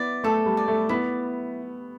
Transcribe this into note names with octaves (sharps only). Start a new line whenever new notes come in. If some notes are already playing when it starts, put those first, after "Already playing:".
Already playing: B3 E4 D5
A3 A4
G3
D5
A3
B3 E4